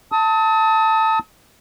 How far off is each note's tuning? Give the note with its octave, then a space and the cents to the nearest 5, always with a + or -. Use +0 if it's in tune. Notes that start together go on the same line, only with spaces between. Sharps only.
A5 +15 D#6 +40